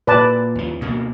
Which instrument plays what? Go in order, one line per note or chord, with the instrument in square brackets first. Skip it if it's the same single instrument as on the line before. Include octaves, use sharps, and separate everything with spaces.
[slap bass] A#2 [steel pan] B4 D5 A5
[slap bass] D#2 F3
D2 B2 A#3